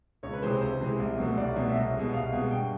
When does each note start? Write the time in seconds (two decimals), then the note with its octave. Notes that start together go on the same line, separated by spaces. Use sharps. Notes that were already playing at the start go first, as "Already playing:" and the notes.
0.23 C#2 C#5
0.33 B4
0.43 C3 E3 G#3 C5
0.61 C#2 C5
0.80 C3 E3 G#3
0.99 C2
1.18 B2 F#3 A3
1.37 C2 D5
1.56 B2 F#3 A3
1.69 E5
1.75 C2 D#5
1.94 G#3
1.99 B2
2.13 C2 F5
2.33 B2 G#3
2.51 G2 G5